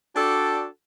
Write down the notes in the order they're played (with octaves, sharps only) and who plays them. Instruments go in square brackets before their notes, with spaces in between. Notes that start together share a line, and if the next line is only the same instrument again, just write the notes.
[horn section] D4 F#4 A4 D5 G5